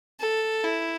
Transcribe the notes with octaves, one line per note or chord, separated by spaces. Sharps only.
A4
E4